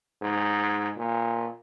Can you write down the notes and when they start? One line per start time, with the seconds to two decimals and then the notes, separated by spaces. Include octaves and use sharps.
0.22 G#2
0.97 A#2